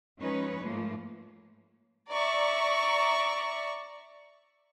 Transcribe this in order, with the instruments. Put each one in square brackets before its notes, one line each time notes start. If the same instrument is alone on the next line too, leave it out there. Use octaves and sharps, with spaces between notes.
[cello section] F3 G#3 C#4 D#4 B4 C#5
G#2 F3 A3 A#3
[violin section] D5 E5 A#5 C#6